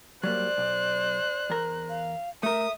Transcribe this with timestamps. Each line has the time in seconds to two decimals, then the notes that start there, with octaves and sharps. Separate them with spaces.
0.23 F#3 G3 A#3 C5 D5 F#6
0.58 B1
1.50 E2 A#4
1.89 F5
2.43 A3 A#4 E5 D#6